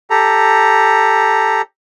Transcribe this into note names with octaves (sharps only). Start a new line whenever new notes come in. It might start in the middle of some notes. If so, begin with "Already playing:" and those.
G4 A4 A#5